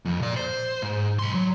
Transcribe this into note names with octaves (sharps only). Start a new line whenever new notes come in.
F2
A#2 D5
C5
G#2
B1 C6
F#3